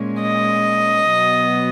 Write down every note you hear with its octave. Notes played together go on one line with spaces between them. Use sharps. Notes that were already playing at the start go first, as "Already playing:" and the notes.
Already playing: A#2 G#3 C#4
D#5
B2 F#3 B3